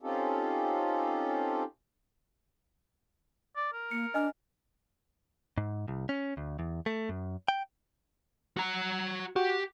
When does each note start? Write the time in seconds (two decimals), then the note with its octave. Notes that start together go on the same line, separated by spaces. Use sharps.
0.01 C4 C#4 D#4 F4 G4 A4
3.56 D5
3.73 A#4
3.91 A#3 C#7
4.14 D4 D#5 G#5 F6
5.57 G#2
5.88 C2
6.09 C#4
6.37 D2
6.59 E2
6.86 A3
7.09 F#2
7.48 G5
8.57 F#4 A#5
9.36 F#4 G4